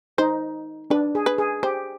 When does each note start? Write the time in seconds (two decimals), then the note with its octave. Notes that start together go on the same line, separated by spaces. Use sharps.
0.18 D#4 C5
0.90 D4 B4
1.15 G#4
1.26 B4
1.38 G#4
1.63 G4 C5